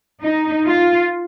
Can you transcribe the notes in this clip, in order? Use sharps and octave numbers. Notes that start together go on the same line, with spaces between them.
D#4
F4